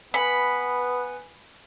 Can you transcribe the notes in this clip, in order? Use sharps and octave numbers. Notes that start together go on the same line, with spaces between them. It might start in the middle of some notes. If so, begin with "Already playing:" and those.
B3 B4 G#5 B5 D#6 C#7